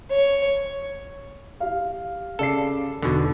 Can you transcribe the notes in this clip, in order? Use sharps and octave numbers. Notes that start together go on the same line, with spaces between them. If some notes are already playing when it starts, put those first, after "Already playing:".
C#5
G4 F5
C#3 A4 D5 C7
B1 E2 B2 D3